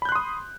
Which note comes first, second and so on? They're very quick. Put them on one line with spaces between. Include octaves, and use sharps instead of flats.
B5 G6 F#6 C6 D#6